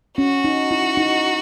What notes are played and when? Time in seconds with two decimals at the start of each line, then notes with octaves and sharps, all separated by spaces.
0.18 C#4 F#4
0.45 D#4
0.71 E4
0.97 D#4